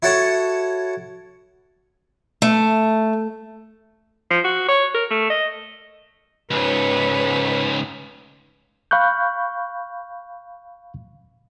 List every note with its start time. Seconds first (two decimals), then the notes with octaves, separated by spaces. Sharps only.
0.03 E4 F#4 A4 C#5 F#5 A5
2.42 A3
4.30 F3
4.44 F#4
4.68 C#5
4.94 A#4
5.11 A3
5.30 D#5
6.51 C#2 G#2 B4 C#5
8.91 F5 B5 C#6 F#6 G6